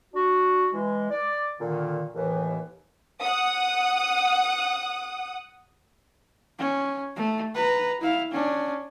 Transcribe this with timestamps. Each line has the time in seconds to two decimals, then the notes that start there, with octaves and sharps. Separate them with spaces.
0.14 D4 F#4
0.73 E3 G#3
1.10 D5
1.60 A#2 D3 D#3
2.15 D#2 A2 E3
3.21 F#5 D#6
6.59 C#4
7.16 A3
7.55 B4 A#5
8.01 E4 F5
8.32 C#4 D4